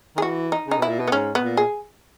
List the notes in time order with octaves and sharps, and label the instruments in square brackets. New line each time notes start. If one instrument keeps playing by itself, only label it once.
[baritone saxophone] D#3 [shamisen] G#4
[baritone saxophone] E3 [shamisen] F#4
[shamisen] D#4
[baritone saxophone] C#3 [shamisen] D#4
[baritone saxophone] B2 [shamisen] E4
[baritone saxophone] A#2
B2
[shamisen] B3
[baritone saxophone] G#2 [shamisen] C#4
[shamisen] B3
[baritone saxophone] A#2
[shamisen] G#4